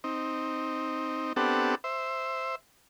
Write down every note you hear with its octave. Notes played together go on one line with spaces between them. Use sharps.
C4 D#4
B3 C4 D4 G4 A4 F#5
C5 E5